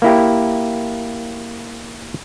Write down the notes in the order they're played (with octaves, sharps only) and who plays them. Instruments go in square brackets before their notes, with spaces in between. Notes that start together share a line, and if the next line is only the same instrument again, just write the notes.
[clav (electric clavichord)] A#3 E4 G4